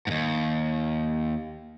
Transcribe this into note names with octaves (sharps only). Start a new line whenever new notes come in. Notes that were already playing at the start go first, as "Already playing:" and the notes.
D#2 G#2